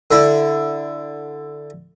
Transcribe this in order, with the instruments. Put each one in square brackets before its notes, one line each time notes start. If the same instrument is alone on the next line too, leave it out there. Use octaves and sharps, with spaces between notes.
[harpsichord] D3 E4